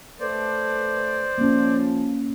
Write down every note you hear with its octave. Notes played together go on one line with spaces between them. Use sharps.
A3 A4 B4 C5 D5
F3 A#3 C#4